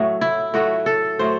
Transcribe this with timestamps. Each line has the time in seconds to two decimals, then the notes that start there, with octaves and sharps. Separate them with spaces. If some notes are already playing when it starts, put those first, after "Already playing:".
Already playing: A2 F#3 A3
0.21 E4
0.54 A2 F#3 A3 F#4
0.86 A4
1.19 A2 F#3 A3 C5